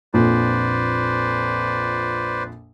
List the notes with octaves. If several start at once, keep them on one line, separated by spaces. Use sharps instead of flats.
A#1 F2 B4 C5 D5